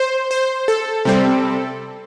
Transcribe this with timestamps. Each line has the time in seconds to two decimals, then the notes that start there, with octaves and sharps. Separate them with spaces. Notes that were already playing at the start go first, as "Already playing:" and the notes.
Already playing: C5
0.31 C5
0.68 A4
1.05 C3 G3 C4